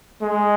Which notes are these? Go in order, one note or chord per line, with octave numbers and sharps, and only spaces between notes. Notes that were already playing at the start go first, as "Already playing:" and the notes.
G#3